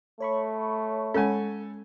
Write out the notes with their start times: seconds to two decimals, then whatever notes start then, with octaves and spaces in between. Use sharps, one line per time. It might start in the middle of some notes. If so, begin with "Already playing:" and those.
0.20 A3 C#5 B5 C#6
1.14 G#3 C#4 A4 G#5